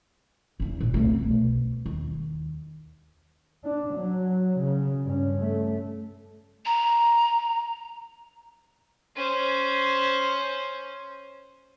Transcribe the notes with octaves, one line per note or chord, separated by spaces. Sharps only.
E2 D3
A#1
C2 A3
B1
D#2
D4
F#3
C#3
G2 C#4
A3
A#5
C#4 C5